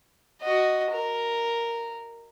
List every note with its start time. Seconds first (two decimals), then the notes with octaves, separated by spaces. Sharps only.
0.41 F#4 D#5
0.91 A#4